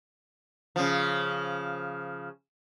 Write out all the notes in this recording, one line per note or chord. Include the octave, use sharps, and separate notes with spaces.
C#3 F3